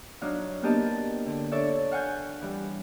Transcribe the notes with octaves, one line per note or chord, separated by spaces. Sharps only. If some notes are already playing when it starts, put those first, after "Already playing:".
F#3 D4 D#4 F5
A#3 B3 D4 G4 D#5 A5
D3
D4 A4 C#5 D5 E5
F5 F#5 G#5 G6
E3 G3 E4